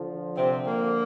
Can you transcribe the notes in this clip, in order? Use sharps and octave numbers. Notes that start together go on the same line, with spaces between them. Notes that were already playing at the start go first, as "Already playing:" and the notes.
Already playing: D3 F3
C3 C4
A#3